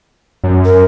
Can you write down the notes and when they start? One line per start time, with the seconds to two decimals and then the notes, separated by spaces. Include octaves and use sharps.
0.44 F#2
0.65 A#4